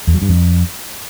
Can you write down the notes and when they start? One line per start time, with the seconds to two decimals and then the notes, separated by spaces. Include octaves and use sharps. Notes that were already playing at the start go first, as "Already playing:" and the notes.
0.07 E2
0.15 F#3
0.22 G2
0.29 F2